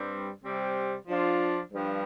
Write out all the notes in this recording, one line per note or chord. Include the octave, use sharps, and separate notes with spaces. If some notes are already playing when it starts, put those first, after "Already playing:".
Already playing: G2 G3 C4
C3 G3 C4
F3 D4 F4
G2 F3